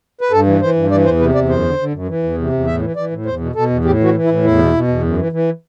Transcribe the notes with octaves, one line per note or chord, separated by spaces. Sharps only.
B4
G2 A4
E3
E3 C5
G2
E3 D5
E2 C5
C3 B4
E2 D5
F#2 C5
D3
D3
F#2
E3
E2
C3
E2
A2 E5
E3
E3 D5
A2
E2 C5
B2
B2 A4
E2
A2 G4
E3 F#4
E3
E4
A2
E2 E4
B2
B2
E2
F#2
E3
E3